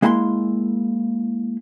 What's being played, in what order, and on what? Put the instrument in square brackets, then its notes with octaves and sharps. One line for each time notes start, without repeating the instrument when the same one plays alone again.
[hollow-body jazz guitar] G#3 A#3 E4 A5 C6